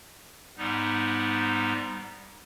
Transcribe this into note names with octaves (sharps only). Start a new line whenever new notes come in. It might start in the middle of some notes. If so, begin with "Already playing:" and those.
G#2 G3 B3 D#4